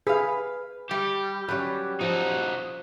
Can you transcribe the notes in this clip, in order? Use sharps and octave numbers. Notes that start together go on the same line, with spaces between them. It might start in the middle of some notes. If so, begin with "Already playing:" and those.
G#4 B4 F5
G3 G4
F#3 G3 C#4 B4
F3 D#4 F#4